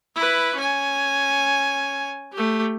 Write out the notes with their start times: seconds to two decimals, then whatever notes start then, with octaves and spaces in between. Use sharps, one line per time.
0.16 E4 B4
0.57 C#4 G#5
2.33 A3 G4